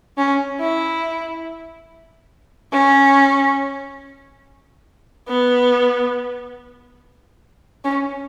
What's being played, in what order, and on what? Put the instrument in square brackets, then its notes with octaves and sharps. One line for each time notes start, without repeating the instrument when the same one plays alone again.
[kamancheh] C#4
E4
C#4
B3
C#4